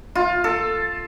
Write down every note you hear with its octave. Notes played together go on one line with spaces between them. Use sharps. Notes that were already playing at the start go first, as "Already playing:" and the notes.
F4
A4